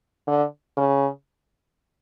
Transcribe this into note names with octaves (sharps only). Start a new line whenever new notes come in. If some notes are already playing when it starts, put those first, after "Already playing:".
D3
C#3